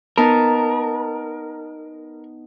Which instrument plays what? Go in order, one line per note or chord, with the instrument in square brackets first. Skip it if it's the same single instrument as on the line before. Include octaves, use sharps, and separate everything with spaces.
[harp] B3 D#4 A5 [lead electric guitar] A#4